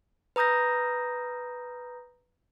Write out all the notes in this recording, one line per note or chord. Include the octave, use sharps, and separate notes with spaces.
B4 A#5 D#6 G6 A#6